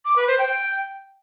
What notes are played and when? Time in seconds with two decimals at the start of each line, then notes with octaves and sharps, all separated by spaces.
0.05 D6
0.16 B4
0.27 C5
0.39 G5